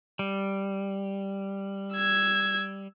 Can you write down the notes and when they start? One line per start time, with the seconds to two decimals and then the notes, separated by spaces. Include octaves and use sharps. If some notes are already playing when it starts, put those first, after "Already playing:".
0.19 G3
1.94 E6 G#6